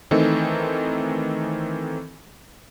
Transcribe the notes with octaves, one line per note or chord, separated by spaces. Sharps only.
D#3 E3 A3 C4 D#4 A4